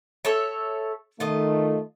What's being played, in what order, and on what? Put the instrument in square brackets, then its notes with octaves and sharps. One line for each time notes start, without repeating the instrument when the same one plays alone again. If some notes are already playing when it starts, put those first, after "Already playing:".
[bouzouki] A4 C#5 E5
[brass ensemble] D#3 A3 [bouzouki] F4 D#5